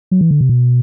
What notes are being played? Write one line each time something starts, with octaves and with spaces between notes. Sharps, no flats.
F#3
E3
D3
C3
B2